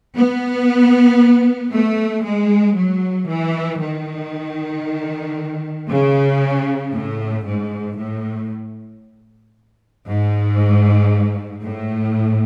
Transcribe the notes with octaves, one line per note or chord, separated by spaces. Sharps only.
B3
A3
G#3
F#3
E3
D#3
C#3
A2
G#2
A2
G#2
A2